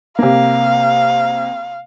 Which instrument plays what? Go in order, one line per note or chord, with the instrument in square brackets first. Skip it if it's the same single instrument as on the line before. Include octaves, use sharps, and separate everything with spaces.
[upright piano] C3 A#3 [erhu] F5